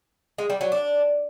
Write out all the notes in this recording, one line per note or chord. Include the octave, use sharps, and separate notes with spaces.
G#3
G3
F#3
D4